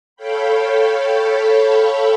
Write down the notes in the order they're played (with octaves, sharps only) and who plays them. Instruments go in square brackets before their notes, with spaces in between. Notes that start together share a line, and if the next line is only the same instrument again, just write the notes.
[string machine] A4 C#5 F5 G5 B5